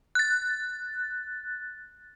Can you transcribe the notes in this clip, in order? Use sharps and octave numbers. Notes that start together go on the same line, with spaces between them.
F#6 A6